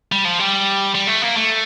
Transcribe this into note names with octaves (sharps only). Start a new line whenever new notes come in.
G3
F3
G3
G3
A3
A#3
A3